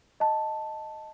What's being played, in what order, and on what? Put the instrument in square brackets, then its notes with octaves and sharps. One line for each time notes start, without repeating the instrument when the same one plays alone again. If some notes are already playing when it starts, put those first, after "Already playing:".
[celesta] D#5 A5